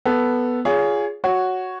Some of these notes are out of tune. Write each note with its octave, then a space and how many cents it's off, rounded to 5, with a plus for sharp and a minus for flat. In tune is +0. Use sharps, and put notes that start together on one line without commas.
B3 +0 A4 +0
F4 +0 G#4 +0 C#5 +30
F#4 +0 C#5 +0